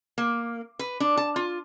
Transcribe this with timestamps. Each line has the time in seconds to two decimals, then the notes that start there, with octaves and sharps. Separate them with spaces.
0.18 A#3
0.79 B4
1.00 D4
1.17 A5
1.36 F4